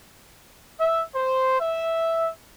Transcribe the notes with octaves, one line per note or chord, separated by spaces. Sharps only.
E5
C5
E5